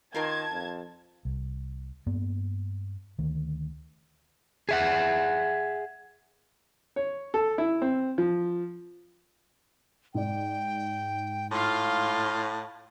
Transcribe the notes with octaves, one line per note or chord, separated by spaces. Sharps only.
D#3 F4 A#4 A5 C6 G#6
F2
C2
G2 A#3 B3
D2 D#3
G#4 E5 F#5
C#5
A4
E4
C4
F3
G#2 D5 G5
A2 F4 F5 C6